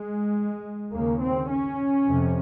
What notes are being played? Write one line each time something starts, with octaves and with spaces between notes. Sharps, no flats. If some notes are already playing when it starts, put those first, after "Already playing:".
Already playing: G#3
D#2 C#3 A#3
C4
C#4
F2 C3